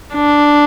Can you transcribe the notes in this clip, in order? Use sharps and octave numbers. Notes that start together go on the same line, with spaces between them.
D4